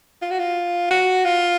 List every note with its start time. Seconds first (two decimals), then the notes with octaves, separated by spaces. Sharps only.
0.22 F4
0.31 F#4
0.39 F4
0.91 F#4
1.25 F4